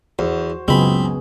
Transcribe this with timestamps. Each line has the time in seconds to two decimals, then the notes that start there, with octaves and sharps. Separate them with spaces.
0.19 E2 F#4 C5
0.68 C#2 F#2 C#3 B3 C4 G#4 B5